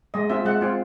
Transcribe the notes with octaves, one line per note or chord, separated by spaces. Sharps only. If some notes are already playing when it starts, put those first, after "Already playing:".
G#3 D#5
C4 F4 E5
G#3 F#5
C4 F4